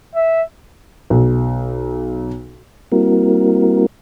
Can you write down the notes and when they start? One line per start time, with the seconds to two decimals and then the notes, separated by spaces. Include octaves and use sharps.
0.15 E5
1.10 B1
2.92 G3 A#3 C4 E4 F#4 A#4